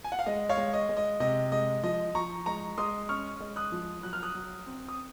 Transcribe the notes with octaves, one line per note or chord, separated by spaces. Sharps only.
G#5
F#5
F5
G#3 D#5
C#5 F5
G#3
D#5
G#3
D#5
C3 D#5
G#3 D#5
F3 D#5
F3 A#5 C#6
G#3 A#5 C#6
G#3 C6 D#6
C#4 C#6 F6
G#3
D#6 F#6
F3
F#3 F#6
F6
D#6 F#6
F#3
C4
D#6